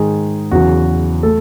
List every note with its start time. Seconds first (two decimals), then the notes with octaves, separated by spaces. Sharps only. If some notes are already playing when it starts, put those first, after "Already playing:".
Already playing: G#2 D#3 G#3 G#4
0.51 E2 C#3 E3 F#3 F#4
1.23 A3 A4